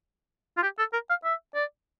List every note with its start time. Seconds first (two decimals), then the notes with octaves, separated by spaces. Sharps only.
0.57 F4
0.63 G4
0.79 A4
0.93 A#4
1.10 F5
1.24 E5
1.55 D5